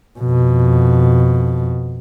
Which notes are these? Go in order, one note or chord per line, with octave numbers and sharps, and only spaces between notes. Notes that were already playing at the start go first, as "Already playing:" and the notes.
F2 B2